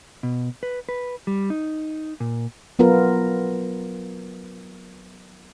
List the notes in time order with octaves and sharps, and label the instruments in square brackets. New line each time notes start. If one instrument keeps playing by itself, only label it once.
[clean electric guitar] B2
B4
B4
G3
D#4
A#2
[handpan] F#3 B3 F4 A#4